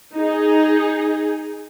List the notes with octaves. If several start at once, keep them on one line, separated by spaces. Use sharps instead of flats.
D#4 G#4